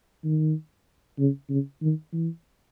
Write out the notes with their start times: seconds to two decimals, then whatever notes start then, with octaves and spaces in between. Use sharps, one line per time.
0.24 D#3
1.19 C#3
1.50 C#3
1.82 D#3
2.13 E3